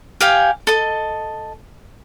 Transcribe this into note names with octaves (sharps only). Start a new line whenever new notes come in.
G4 F5 G5 G#5
A4 D#5